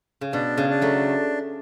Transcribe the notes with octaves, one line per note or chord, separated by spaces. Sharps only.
C#3
B2 D4
C#3
D4
F#3 A3